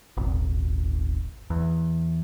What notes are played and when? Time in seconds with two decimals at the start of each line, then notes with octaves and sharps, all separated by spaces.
0.17 D#1 G#1
1.50 E2